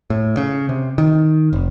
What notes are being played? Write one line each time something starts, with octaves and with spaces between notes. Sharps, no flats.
A2
C#3
C3
D#3
F1